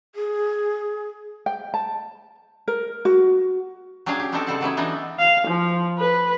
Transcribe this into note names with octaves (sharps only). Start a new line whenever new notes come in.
G#4
G5
A5
A#4
F#4
F#3 C#4 D4 G4 G#4 F5
G4
B3 C4 D4 D#4 G4 A4
C#3 G3 A4 C5 F#5 A5
F#3 B3 C#4 E4
E3 B3 D4 D#4
F5
F3
B4